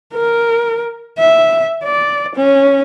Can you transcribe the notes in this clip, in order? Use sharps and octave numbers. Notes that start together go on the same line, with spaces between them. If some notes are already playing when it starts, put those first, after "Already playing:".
A#4
E5
D5
C#4